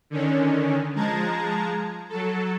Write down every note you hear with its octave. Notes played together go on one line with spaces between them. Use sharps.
D3 D#3 C#4
F3 G#3 A5 A#5 G#6
F#3 A4